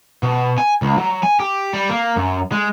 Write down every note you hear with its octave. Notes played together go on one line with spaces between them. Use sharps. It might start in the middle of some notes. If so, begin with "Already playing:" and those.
B2
G#5
C#2
F#3
G#5
G4
G3
A#3
F#2
G#3